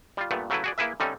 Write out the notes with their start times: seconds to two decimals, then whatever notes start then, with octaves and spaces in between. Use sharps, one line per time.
0.17 G3 F4
0.31 G2 A#2 A3 B3
0.50 C#3 F#3 A3 E4 B4
0.64 F#4 G#4 D5
0.78 A#3 E4 G#4 B4 E5
1.00 D3 G3 A3 C4 C#4 D#4